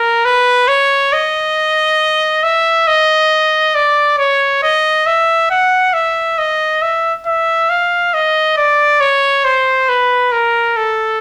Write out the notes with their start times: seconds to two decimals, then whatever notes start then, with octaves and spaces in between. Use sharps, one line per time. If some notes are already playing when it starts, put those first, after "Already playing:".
Already playing: A#4
0.25 B4
0.68 C#5
1.13 D#5
2.43 E5
2.87 D#5
3.75 D5
4.18 C#5
4.63 D#5
5.06 E5
5.50 F#5
5.94 E5
6.38 D#5
6.82 E5
7.26 E5
7.70 F5
8.14 D#5
8.57 D5
9.00 C#5
9.45 C5
9.89 B4
10.32 A#4
10.76 A4